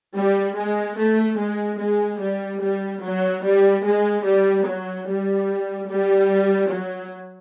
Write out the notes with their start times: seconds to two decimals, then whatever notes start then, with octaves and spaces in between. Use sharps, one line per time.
0.16 G3
0.56 G#3
0.98 A3
1.38 G#3
1.79 G#3
2.20 G3
2.61 G3
3.03 F#3
3.44 G3
3.85 G#3
4.25 G3
4.66 F#3
5.07 G3
5.89 G3
6.72 F#3